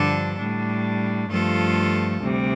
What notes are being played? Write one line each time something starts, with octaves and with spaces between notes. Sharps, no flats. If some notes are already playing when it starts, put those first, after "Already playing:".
Already playing: G2 D3 F3 D4 A4
A2 G3 D4
G2 F3 A3 F4 A4
D2 C3 G3